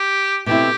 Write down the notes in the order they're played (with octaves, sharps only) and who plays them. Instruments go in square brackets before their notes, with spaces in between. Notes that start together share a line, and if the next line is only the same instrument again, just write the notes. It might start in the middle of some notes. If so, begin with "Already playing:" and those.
Already playing: [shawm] G4
[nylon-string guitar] B2 A3 C4 E4 [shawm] G4